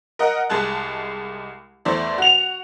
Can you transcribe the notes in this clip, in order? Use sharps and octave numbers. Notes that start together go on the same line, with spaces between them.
A#4 D#5 F#5
C2 G#3 G#4 A5 F#6
E2 A3 E4 C5 D5
F#4 F7